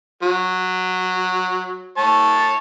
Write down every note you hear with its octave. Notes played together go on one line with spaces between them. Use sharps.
F#3
C#5 A5